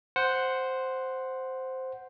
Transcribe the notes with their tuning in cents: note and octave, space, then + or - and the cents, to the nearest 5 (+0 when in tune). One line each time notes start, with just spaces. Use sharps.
C5 +0 F#5 +0